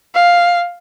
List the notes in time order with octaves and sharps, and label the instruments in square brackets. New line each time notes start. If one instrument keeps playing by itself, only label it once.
[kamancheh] F5